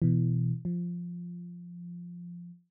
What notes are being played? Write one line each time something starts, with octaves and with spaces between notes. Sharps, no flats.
B2 E3
F3